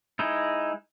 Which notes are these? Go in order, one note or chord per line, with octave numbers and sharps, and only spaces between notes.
G#3 D#4 E4